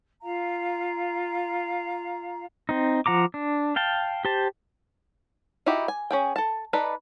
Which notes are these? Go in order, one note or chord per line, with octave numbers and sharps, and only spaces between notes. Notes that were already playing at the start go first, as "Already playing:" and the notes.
F4 F5 A#5
C4 D#4
F3 F#5 A#5 D6
D4
F5 G5 A5
G4 C5 A5
D#4 E4 F#4 G4
G#5
C#4 G#4 G5
A4 A5
D#4 A4 B4 D5